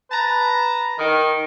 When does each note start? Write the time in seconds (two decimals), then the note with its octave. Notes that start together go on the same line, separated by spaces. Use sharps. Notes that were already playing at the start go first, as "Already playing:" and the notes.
0.12 B4 A5 A#5
0.98 D#3